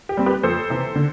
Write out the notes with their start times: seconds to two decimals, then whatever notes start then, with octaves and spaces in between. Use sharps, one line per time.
0.09 G4
0.17 G3 C4
0.26 G4 B4
0.43 F2 A4 C5
0.70 C3 E3
0.96 D3